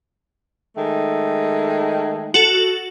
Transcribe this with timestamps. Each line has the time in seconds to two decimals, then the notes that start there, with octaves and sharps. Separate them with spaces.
0.77 D#3 G#3 A3
2.34 F#4 A4